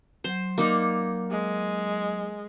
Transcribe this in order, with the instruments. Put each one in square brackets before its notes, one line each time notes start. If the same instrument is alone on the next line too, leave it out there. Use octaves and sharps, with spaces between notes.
[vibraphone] F#3 F#5 [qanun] C5
[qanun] A#3 D#4 D5
[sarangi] G#3